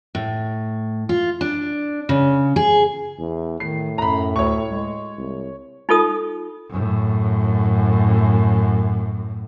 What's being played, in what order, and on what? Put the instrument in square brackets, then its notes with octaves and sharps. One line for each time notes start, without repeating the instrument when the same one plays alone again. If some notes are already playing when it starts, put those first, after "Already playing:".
[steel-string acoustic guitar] A2
F4
D4
C#3
G#4
[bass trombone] E2
[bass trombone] A2 [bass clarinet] D#3 [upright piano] C7
[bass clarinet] F#2 [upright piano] A#5 B5
[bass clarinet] D2 [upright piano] C#5 C#6
[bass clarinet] G#3
[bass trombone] C2
[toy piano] D#4 F4 A4 D#6
[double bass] F#2 A2